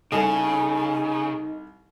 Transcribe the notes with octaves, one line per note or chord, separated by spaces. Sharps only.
C2 C#3 D#4 A4 D#5 G#5